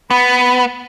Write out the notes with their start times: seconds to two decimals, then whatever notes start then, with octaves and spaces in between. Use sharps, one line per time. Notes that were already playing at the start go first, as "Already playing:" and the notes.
0.11 B3 B5